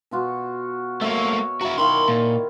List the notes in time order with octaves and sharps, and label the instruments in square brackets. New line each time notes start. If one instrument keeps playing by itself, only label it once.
[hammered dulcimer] B2 F4 F#4
[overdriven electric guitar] A3 A#3 [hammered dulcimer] C#5 E5
[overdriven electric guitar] E4 F#4 [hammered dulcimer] A#5
[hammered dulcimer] D#3 E4 F4 [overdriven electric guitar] B5 C6
[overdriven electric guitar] A#2